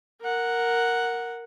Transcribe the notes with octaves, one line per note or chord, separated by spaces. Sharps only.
A#4 F#5